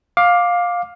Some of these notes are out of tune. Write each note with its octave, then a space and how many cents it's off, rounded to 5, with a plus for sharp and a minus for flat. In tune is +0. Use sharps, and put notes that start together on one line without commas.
F5 +15 D6 +0